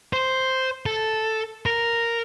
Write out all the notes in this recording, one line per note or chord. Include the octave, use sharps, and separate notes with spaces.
C5
A4
A#4